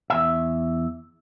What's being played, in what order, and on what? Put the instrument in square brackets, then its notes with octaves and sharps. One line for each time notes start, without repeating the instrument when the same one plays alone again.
[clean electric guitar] E2 E5